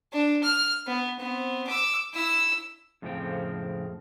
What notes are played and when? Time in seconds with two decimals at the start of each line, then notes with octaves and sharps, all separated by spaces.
0.13 D4
0.44 F6
0.87 B3
1.20 B3 C4
1.67 D6 E6
2.14 E4 E6
3.02 F2 A2 C#3 F3 C4 G5